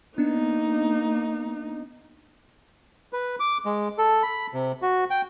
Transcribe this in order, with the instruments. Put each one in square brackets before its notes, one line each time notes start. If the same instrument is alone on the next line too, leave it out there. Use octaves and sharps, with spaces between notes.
[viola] A#3 D#4 [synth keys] B3 D4
[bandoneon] B4
D6
G#3
A4
B5
C3
F#4
G5